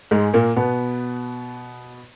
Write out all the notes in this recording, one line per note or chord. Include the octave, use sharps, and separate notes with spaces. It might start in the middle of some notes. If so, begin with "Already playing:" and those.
G#2 G#3
A#2 A#3
B2 B3